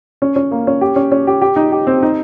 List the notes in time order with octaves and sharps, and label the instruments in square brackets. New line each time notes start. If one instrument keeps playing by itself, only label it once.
[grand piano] C#4
C#4
A#3
C#4
G4
C#4
C#4
G4
G4
D#4
G4
C4
D#4